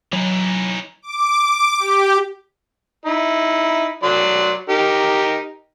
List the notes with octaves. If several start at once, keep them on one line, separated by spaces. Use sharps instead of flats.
E3 F#3 D#4
D6
G4
D#4 E4
F#3 D5 C6
D#4 G4 A#4